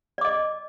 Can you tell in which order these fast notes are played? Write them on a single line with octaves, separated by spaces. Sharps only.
D5 D6 D#5